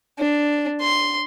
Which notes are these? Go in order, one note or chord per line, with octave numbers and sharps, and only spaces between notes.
D4
C6